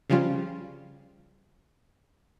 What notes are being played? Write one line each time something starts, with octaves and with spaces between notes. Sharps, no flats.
C#3 F3 G3 C#4 F4